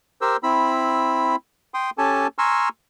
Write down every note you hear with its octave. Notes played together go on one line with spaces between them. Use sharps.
G4 A#4 C5 E6
C4 E4 B5 E6
G5 C6 D#6
C#4 G4 A4 G#5 A5
G#5 A#5 C6 C#6 E6 F6